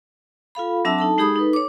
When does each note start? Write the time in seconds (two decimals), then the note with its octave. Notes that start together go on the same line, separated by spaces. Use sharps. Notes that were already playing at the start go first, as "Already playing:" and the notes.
0.55 F4 A4 F5 B5
0.85 F#3 C4 D4 E5 A5 E6
0.98 D#4 A4 A5
1.18 G#3 D#4 G4 G#4 B5 D#6
1.36 D#4 A4 B4
1.53 C#5 D6